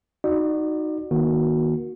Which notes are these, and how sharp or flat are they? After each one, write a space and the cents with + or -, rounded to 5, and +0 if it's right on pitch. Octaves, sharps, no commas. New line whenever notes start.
D#4 +0 F#4 +0 D5 +35
D#3 +5 A#3 +25 F#4 -10